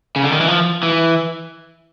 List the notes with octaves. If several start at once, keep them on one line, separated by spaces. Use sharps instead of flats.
C#3
D3
D#3
E3
F3
E3